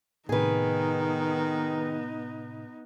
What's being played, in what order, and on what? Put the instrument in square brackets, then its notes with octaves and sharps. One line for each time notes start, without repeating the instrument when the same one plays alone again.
[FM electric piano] A2 C3 [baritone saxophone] D#3 [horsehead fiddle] B3 D#4 [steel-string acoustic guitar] G#4 B4